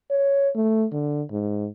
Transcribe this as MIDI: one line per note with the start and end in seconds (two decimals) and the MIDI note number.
0.10 0.49 73
0.55 0.86 57
0.93 1.22 50
1.31 1.67 44